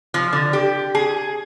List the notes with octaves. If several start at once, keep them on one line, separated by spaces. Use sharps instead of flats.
F3
D3
G4
G#4